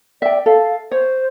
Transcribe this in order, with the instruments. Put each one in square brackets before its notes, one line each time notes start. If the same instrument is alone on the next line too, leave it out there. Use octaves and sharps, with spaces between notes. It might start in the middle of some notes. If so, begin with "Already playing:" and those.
[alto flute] D5 [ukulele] E5 G5
[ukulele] A4 [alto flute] F5
[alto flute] C5 [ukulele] C#5